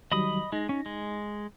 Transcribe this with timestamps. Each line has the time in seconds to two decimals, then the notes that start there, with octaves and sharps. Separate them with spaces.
0.12 D#3 F#3 G3 D#5 B5 D#6
0.52 G#3 D#4 A#6
0.69 C#4
0.86 G#3